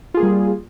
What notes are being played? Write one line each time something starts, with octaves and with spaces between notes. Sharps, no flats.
G3 A#3 F4 G#4